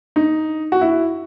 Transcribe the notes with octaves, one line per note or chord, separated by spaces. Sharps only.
D#4
F#4
E4